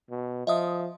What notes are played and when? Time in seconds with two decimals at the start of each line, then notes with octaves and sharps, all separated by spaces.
0.10 B2
0.47 F3 D#5 E5 D#6